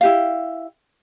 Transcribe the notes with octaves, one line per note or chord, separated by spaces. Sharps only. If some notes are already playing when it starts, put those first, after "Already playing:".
E4 G4 F5